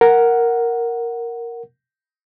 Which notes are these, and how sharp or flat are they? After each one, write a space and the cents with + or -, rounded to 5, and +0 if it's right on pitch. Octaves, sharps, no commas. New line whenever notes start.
A#4 +0 F#5 +0